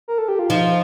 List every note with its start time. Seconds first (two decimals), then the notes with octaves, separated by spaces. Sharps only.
0.08 A#4
0.18 A4
0.28 G4
0.39 F4
0.50 F3 D#4